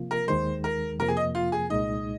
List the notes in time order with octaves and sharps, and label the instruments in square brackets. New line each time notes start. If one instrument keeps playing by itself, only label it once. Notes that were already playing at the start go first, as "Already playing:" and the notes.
Already playing: [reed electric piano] C3 F3 A#3 F4
[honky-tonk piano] A#4
[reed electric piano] D#2 D#3 G#3 [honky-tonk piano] C5
[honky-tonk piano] A#4
[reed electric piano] F2 C3 F3 A#3 [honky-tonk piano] A#4
[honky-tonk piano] G#4
D#5
F4
G#4
[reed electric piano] C2 A#2 G#3 D#4 [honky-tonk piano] D#5